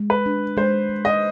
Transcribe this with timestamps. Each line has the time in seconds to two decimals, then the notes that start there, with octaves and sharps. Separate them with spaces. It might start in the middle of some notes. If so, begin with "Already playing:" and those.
Already playing: G#3
0.10 B4
0.26 D4
0.57 G#3 C5
0.89 G#3
1.05 D#5